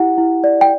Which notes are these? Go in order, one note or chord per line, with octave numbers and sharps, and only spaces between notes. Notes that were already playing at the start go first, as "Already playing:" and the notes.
Already playing: E4 G4 F#5
E4
D5
G5